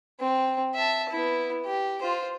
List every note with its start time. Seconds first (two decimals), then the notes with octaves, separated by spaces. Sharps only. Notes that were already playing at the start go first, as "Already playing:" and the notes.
0.20 C4
0.75 E5 A5
1.10 B3 E4
1.66 G4
2.02 F4 C5